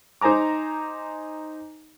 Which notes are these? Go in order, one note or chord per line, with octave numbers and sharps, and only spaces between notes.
D#4 C5 G#5 A#5 D6